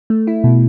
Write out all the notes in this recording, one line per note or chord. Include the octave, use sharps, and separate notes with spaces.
A3
E4
B2